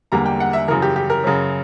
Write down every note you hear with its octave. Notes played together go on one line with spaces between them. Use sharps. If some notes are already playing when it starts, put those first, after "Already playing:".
E1 E2 D3 G3 A#3 A#5
G5
F#5
E5
F#2 C#3 E3 A#4
G4
G4
A#4
F#2 C#3 F#3 C#4